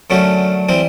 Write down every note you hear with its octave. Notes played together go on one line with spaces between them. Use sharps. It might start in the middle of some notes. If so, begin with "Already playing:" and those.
F#2 D3 F#3 A3 C#4
E3 G3 C4